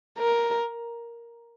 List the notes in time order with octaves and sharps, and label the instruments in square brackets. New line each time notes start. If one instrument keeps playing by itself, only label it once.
[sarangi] A#4